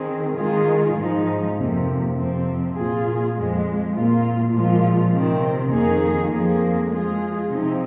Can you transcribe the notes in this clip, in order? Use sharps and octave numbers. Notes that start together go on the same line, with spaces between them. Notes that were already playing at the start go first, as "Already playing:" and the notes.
Already playing: D#3 C4 G#4
D#3 G#3 F4 G#4
G#2 F3 G#3 D#4
F2 C3 F3 A#3
F2 C3 F3 C4
A#2 A#3 F4 G#4
F2 F3 G#3
A#2 A#3 F4
A#2 F3 G#3 F4
C3 D#3 C4
F2 D#3 A#3 D#4 G#4
F2 F3 A#3 G#4
F3 G#3 F4 G#4
C3 F3 C4 D#4